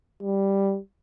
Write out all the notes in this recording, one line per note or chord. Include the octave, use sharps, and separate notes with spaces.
G3